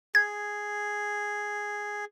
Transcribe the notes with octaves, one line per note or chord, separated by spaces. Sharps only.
G#4 G#6